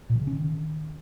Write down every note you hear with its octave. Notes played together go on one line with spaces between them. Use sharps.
A#2
E3
C#3
C#4
D#3